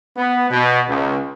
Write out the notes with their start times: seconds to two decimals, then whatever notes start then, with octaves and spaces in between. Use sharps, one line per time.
0.17 B3
0.51 B2
0.89 C#2